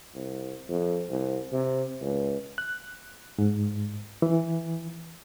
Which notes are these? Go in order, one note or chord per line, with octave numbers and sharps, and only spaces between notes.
C2
F2
C2
C3
C#2
F#6
G#2
E3